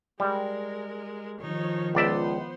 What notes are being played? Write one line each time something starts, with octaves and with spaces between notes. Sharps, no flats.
G3 G#3 A#4
D#3 F3 D#4 C#5
C#2 B3 C5 D5 E5